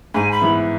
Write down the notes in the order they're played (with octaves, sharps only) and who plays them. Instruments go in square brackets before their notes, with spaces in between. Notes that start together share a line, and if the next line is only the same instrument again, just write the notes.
[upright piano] G#2 [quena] G#5
[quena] B5
[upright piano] E3 B3